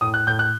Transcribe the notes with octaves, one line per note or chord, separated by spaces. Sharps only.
A2 D#6
F#6
A2 G6
F#6